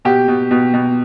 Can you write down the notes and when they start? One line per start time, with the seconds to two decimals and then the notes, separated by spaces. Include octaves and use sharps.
0.05 B2 G4
0.28 B2
0.51 B2
0.74 B2